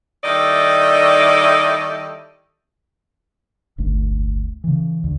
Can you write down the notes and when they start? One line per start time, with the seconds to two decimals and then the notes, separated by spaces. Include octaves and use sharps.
0.24 D#3 G3 E4 A4 D5 D#5
3.78 D1 G1 A3
4.64 C#3 E3
5.04 D2